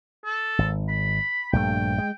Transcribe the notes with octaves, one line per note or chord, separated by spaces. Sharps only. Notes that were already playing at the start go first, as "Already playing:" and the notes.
A4
G#1
B5
A#1 G2 A3 G5
G#3